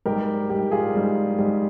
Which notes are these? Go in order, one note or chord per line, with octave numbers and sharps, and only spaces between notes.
G#2 G3 G4 A#4
G#2 G3 G4
F4 G#4
G#2 G3
G#2 G3